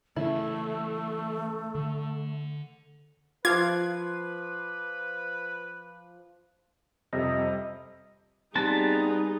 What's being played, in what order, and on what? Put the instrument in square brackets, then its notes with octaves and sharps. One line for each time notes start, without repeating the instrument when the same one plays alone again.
[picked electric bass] C#3 E3 C#4 [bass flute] A3 [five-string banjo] E4
[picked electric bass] D3
[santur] F3 C6 D6 [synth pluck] F4 F5 [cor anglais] B4 [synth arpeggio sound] G#6
[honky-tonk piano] F2 C3 G3 [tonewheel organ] D#5
[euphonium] G3 [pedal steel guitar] B3 C4 A5 [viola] D#4 G#4